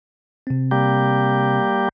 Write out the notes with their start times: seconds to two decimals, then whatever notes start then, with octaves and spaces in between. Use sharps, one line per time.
0.47 C3 C4
0.71 G3 A#3 G4